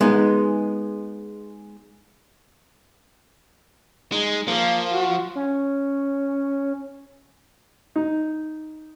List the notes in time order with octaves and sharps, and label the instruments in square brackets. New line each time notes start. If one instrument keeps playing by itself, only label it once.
[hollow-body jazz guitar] G#3 B3 D#4
[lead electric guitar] G#3 [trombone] D#4
[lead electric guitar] F3 [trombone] A#3
[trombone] F#4
[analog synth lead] C#4
[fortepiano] D#4